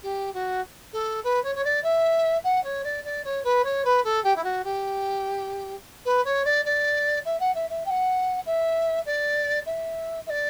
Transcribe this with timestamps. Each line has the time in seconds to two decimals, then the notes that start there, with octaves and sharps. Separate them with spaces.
0.03 G4
0.33 F#4
0.93 A4
1.23 B4
1.43 C#5
1.55 C#5
1.64 D5
1.83 E5
2.44 F#5
2.63 C#5
2.83 D5
3.04 D5
3.24 C#5
3.44 B4
3.64 C#5
3.84 B4
4.04 A4
4.23 G4
4.35 E4
4.43 F#4
4.64 G4
6.05 B4
6.24 C#5
6.44 D5
6.65 D5
7.25 E5
7.40 F#5
7.54 E5
7.69 E5
7.85 G5
7.90 F#5
8.45 E5
9.05 D5
9.66 E5
10.26 E5
10.29 D5